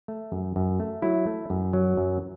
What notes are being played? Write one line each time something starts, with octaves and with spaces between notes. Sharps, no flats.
A3
F#2
F#2
A3
F#3 E4
A3
F#2
F#3
F#2